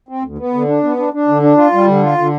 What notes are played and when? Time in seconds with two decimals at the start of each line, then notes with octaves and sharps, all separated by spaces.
0.09 C4
0.23 D2
0.38 B3
0.54 D3
0.68 D4
0.84 B3
0.98 D4
1.13 D4
1.28 D3
1.43 D4
1.57 F4
1.73 G3
1.87 D3
2.03 F4
2.18 D3